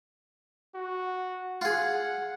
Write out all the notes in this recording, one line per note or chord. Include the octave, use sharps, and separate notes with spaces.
F#4
F4 G#4 F#5